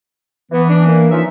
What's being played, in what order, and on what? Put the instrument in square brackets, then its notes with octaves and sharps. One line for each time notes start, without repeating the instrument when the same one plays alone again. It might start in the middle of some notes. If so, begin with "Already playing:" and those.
[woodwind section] E3 [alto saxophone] B3
[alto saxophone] D4
A#3
[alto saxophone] F3 [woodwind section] C#4 D#4 E5